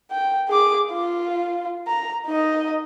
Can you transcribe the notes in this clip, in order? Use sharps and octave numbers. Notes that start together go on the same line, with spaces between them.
G5
G#4 D6
F4
A#5
D#4 D#5